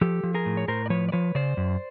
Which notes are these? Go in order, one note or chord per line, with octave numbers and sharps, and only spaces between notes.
F3 G4 A4
F3
G#4 A#4
A2
C#5
A2 A#4 C5
D5
F3 B4 C#5
D5
F3 B4 C#5
C#3 C5 D5
F#2